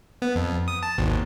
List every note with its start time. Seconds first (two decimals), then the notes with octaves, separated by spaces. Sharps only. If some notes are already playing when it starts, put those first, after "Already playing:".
0.22 B3
0.35 F2
0.68 D#6
0.83 A5
0.98 G#1 D#2